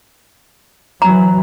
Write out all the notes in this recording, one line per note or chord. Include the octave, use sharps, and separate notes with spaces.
E3 F#3 A#5